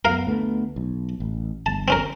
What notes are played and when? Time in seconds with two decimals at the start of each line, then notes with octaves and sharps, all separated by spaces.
0.05 F#2 B3 A#4 F5
0.27 D2 A3 B3
0.76 B1
1.20 A1
1.66 G1 A5
1.88 C4 C#4 A#4